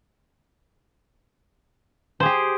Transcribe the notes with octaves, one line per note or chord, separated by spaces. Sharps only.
G4 G#4 C5